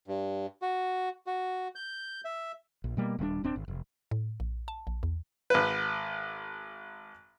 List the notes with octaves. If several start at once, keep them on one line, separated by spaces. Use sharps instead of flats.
G2
F#4
F#4
G6
E5
A#1
B2 G3 A#3
D#1 G3 A3 D4
D#1 C4 D4
G#1
F1
A2
A#1
A5
A#1
E2
G#1 B4